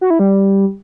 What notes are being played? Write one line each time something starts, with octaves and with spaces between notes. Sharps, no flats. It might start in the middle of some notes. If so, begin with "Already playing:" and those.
F#4
E4
G3